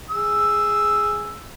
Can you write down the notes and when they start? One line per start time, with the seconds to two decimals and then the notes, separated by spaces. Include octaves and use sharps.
0.10 G#4 E6